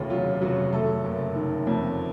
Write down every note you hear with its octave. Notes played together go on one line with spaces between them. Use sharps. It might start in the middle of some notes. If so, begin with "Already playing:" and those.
Already playing: F1 D#2 C#3 A3 F4
F#3 F4
F1 F#3 F#4
F#3 A3 A4
F#1
D#3
F2